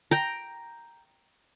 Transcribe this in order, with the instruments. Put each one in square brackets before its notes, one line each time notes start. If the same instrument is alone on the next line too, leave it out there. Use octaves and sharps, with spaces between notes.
[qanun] G5 A#5